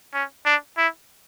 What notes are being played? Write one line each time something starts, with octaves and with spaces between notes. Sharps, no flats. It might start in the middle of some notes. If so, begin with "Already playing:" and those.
C#4
D4
E4